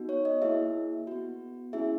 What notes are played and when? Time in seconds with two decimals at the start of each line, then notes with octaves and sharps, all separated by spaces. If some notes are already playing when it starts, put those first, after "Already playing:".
Already playing: B3 D#4 F#4
0.09 C#5
0.25 D#5
0.42 A#3 E4 G#4 E5
1.07 B3 F#4
1.73 A#3 C#4 E4 G#4 E5